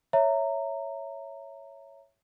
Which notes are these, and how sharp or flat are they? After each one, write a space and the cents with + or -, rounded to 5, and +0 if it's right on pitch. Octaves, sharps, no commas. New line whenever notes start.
C#5 +0 E5 +5 A#5 -15